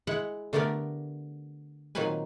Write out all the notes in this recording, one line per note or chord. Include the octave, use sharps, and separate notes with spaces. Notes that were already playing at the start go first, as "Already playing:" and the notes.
G#3 E4 F#5
D3 A3 B3 G4 A#4 D5
A#2 D#3 F#3 C4 B4 G#5